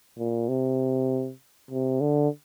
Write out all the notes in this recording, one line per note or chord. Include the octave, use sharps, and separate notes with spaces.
A#2
C3
C3
D3